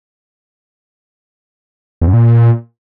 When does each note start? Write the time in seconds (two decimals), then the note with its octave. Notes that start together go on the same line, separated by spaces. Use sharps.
2.02 E2
2.07 F#2
2.13 A#2